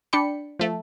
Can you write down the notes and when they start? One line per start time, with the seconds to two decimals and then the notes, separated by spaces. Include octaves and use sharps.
0.13 D4 D5 G5 B5 C#7
0.59 F3 A3